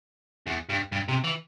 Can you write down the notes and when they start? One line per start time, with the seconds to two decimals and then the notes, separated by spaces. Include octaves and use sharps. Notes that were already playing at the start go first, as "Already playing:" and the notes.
0.47 E2
0.69 G2
0.92 G2
1.09 C3
1.24 E3